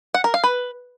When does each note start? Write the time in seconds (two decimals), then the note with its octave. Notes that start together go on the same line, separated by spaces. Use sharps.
0.14 F#5
0.24 A#4
0.34 F5
0.44 B4